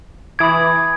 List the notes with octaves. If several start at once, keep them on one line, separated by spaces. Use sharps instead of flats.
E3 B5 D6 D#6 G#6